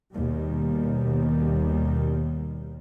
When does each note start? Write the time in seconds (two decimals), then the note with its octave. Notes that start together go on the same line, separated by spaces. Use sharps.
0.13 D#2 B2 D#3 G3